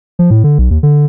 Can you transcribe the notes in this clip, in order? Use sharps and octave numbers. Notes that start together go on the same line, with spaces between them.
F3
A2
D3
B1
D#2
D3